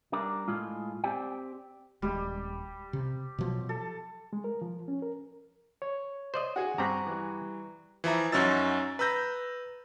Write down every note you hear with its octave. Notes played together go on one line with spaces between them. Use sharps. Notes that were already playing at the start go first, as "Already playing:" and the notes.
G3 D4 A#4 D5
A2 G#3 F4
C4 G4 D5 G5
D#1 G3 G#3 G4
C3
B2 F3 F#3
A4
G#3
A#4
F3
C#4
A#4
C#5
C5 D5 D#5
F#4 G#4
G2 C4 A#5 C#6 D6 F#6 B6
E3 G3
E3 F3 E5 A#5
F#2 F#3 C#4 D#4 E6 A6
B4 A#5 E6 G6 A#6